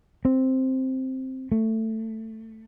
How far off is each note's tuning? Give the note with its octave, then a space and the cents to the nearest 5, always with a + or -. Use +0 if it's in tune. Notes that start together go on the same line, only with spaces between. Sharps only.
C4 +0
A3 +15